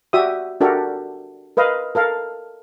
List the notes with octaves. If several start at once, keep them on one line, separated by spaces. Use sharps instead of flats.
F#4 G4 D5 E5 D#6
D4 F#4 G4 A4 A#4
A#4 B4 D#5 F5
A4 A#4 F5